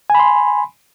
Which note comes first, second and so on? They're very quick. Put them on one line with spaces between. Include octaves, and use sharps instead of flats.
G#5 B5 C6